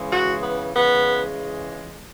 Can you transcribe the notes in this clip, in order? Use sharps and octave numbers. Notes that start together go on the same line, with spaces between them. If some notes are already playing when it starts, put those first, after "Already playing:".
Already playing: C#3 E3 G#3
F#4
B3
C#3 E3 G#3 B3